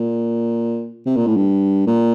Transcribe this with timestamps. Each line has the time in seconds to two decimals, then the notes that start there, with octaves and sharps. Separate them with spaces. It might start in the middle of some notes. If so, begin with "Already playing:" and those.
Already playing: A#2
1.06 C3
1.16 A#2
1.27 A2
1.37 G2
1.87 A#2